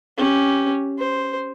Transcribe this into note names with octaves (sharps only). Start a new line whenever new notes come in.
C#4 G4
C5